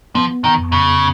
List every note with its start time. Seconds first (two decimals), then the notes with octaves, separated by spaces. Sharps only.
0.15 F3 B3
0.44 D#3
0.57 F2
0.72 C#3